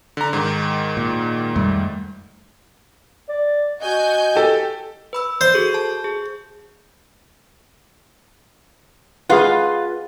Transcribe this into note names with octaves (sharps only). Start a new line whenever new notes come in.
D3 A#5
G#2 D#3
A#2
F2 G3 A3
D5
F#4 D#5 G#5 G6
G4 A4
B4 B5 E6
C5
F#4 G#4 A4
A5
G#4
F4 G#4 B4 F5 F#5